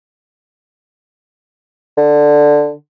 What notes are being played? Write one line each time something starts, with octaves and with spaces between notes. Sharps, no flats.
D3